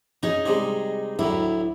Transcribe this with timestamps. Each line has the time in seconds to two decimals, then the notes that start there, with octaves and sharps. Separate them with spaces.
0.23 C#4 D#4 G#4
0.46 C3 G3 G#3
1.19 D2 A2 F#3 E4